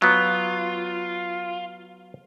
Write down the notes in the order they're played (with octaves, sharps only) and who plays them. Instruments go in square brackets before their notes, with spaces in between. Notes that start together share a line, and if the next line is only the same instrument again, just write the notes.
[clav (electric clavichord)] F#3 B3 [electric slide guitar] F4